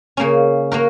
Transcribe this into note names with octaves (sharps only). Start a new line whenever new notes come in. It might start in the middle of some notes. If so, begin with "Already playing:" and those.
C#3 A#3 C#4
A#3 F#4 A#4